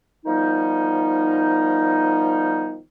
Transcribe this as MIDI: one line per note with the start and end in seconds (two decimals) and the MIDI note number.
0.25 2.79 51
0.25 2.79 53
0.25 2.79 55
0.25 2.79 59
0.25 2.79 63